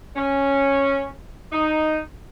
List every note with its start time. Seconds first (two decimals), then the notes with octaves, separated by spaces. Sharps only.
0.17 C#4
1.52 D#4